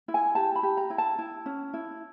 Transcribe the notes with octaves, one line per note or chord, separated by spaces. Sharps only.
E4
G#5
G4 A5
B5
G4
A#5
E4
A5
E4
C#4
E4